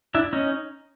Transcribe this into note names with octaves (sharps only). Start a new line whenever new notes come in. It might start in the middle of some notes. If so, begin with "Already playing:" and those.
D4 E4
C#4 D#4